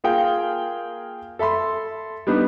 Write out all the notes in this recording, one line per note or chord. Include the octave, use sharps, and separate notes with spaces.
A#3 F4 G#4 A#4 F5 G5
A4 E5 B5 C6
G3 B3 D4 D#4